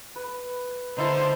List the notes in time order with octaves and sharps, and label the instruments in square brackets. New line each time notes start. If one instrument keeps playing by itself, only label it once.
[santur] B4
[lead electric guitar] D3 [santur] D#4 E4 [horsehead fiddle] C5